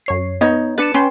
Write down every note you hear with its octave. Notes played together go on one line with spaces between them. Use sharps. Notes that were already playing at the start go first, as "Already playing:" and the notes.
F#2 C#5 C7
B3 D#4 C#5 D#5
D4 B4 A6 C#7 E7
C#4 B4 G5 C6